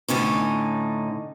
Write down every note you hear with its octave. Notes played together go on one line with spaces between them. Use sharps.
A2 D3 C#4 D#4